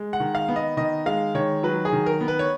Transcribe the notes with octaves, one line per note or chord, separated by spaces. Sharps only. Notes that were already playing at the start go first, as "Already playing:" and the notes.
Already playing: G#3
F#5
D#3
F5
B3
D#5
D#3 D#5
G#3 F5
D#3 C#5
F#3 B4
G#4
D#3
A#4
B3
B4
C#5